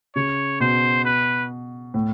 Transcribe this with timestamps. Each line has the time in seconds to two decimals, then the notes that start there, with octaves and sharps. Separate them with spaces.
0.16 C#3 C#5
0.60 B2 C5
1.05 B4
1.94 A2